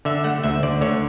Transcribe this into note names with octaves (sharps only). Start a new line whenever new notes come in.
D3 E5
A3 F#5
D2 E5
D2 D5
D3 C#5